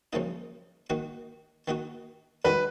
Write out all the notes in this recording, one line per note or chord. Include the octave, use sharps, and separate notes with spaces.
F#2 C#3 F3 A#3 D#4
D#3 A#3 D#4 F#4
D#3 A#3 D#4 F#4
F#2 D#3 G#3 D#4 F#4 B4